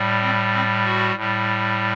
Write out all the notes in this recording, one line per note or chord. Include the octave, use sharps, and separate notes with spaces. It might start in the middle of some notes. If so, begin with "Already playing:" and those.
Already playing: A2 G3
C4
C4
F#4
A2 G3